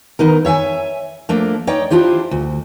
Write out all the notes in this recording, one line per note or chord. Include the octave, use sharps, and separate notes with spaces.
D#3 B3 D#4 A#4
C#5 E5 F#5 G#5
F3 A3 A#3 D4
D#4 C#5 D5 G5
D4 E4 F4 G4 C5
D2